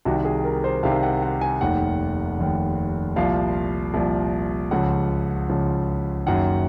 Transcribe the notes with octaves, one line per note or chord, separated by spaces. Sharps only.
C2 C3 D#3 F#4
G#4
A#4
C5
C2 C3 D#3 F5
F#5
F#5
G#5
F1 D#2 D#3 F#5
F1 D#2 D#3
C2 A#2 F3 F5
C2 A#2 F3
C#2 C#3 F3 F#5
C#2 C#3 F3
F#1 F#2 D#3 F#5